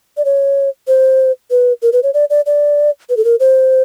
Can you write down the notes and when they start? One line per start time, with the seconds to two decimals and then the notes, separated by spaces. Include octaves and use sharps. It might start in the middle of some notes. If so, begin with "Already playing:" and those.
0.17 D5
0.25 C#5
0.87 C5
1.51 B4
1.82 A#4
1.93 B4
2.03 C#5
2.14 D5
2.30 D5
2.46 D5
3.09 B4
3.17 A4
3.25 A#4
3.40 C5